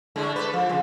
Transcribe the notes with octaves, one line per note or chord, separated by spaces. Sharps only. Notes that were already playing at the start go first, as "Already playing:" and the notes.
A2 D3 G#3
A4 B4
F3
C#3 G3